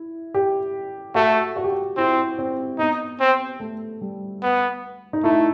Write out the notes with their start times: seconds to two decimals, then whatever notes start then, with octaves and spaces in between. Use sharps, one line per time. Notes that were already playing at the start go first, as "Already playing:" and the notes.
Already playing: E4
0.34 G4
1.15 A3 F#4
1.56 F#4
1.64 G4
1.72 F#4
1.97 C4 E4
2.39 C4
2.78 B3 D#4
3.20 C4
3.60 A3
4.01 G3
4.42 B3
5.13 D#4
5.23 A3 E4